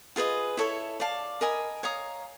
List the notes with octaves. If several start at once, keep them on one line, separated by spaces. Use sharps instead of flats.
F4 G#4 B4 D#5
E4 A4 C#5 E5
D5 F5 A5
A#4 D#5 G#5 B5
C#5 F5 A#5 D#6